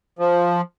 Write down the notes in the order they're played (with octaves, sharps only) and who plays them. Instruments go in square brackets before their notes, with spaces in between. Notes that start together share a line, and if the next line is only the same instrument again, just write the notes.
[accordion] F3